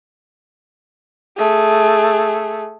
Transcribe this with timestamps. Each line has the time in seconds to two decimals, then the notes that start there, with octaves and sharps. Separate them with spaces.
1.37 A3 G#4